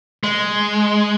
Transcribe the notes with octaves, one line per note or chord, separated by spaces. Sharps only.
G#3